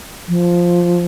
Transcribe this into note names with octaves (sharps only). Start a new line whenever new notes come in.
F3